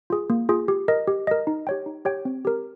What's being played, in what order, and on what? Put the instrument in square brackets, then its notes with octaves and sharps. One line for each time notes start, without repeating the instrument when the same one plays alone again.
[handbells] F4 G#4
A#3
F4 G#4
G4
A#4 D#5
G4
A#4 D#5
D#4
G4 C#5 G5
D#4
G4 C#5 G5
C4
G4 A#4